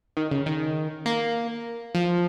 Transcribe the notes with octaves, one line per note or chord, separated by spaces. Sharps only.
D#3
C#3
D#3
A#3
F3